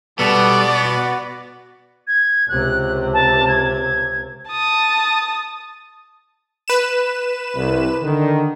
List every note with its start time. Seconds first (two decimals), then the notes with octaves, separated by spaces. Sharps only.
0.19 B2 G3 B3 A4 D5
0.85 F#4
2.07 G#6
2.49 C#2 C3 F#6
3.13 A5
3.48 G#6
4.50 A5 D#6
6.68 B4 E7
7.55 C2 C3
8.03 D3 D#3